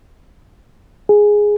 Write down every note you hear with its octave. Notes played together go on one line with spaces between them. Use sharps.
G#4